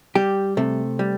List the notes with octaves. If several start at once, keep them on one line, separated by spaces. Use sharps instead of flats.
G3 G4
C3 A3
G3